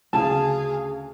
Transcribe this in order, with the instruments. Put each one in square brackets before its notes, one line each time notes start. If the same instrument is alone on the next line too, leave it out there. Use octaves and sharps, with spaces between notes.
[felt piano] D2 C#3 [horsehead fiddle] G#4 F5 [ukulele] A5